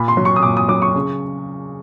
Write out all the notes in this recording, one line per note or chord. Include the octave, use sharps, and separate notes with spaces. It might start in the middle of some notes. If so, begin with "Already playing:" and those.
Already playing: A#2 B5
C6
F#3
C#6
D#6
A#2 D6
D#6
F#3 D6
C#6
C#3